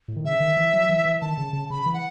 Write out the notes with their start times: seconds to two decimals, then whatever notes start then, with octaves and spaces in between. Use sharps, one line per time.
0.08 A2
0.16 D#3
0.25 C#3 E5
0.40 D#3
0.57 E3
0.73 F#3
0.89 E3
1.05 E3
1.21 D#3 A5
1.37 C#3
1.53 C#3
1.70 C#3 B5
1.86 E3
1.93 F#5